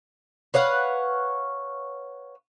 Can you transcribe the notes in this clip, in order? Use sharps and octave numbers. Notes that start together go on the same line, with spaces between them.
B4 C#5 F5 F#5